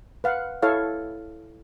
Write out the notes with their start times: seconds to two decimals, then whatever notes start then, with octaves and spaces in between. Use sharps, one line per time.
0.24 B4 F5 F#5
0.62 E4 A4 C#5 F5